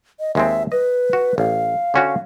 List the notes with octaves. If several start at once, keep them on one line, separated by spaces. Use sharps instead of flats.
D#5
D#2 G#3 C4 E5
B4 D#5
F#4
A1 F5
D3 C#4 F#4